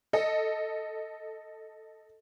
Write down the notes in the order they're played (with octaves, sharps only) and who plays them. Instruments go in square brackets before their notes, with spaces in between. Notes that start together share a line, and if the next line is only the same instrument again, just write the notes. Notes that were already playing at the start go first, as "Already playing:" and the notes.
[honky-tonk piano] A4 D#5